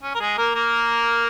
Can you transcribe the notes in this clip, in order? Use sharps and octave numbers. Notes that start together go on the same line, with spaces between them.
C#4
A#4
G#3 G#4
A#3 A#4
A#3 A#4